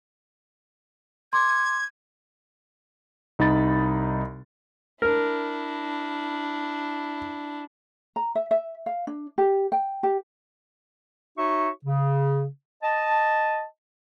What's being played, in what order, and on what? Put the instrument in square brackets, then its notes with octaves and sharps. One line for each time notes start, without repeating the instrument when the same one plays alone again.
[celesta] C6 D6 [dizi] G#6
[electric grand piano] C2 D#4 B5 A6
[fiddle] D4 E4 [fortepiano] A#4
[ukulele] A#5
E5
E5
F5
D4
G4
G5
G4
[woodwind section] D#4 F#4 C#5 E5 C#6
C#3
D#5 A5